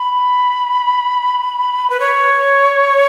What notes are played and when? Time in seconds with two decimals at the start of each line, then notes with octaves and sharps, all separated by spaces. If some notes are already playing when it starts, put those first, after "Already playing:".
Already playing: B5
1.90 B4
2.00 C#5